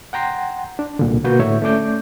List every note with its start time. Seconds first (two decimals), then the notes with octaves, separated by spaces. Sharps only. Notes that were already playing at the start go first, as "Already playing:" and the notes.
0.13 F#5 G5 A#5 C6
0.79 D4
0.99 C2 A#2 D3
1.24 B2 A#3 F#4 B4 G6
1.39 A2 D3 C#5 E5
1.62 A3 C#4 D5 D6 G6